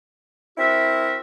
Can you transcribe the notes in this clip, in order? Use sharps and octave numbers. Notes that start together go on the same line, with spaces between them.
C4 E4 F#4 A#4 E5